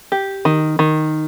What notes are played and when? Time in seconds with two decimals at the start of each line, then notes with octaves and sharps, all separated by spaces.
0.12 G4
0.45 D#3
0.79 D#3